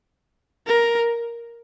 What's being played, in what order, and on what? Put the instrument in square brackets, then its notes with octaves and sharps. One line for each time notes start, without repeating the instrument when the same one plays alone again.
[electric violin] A#4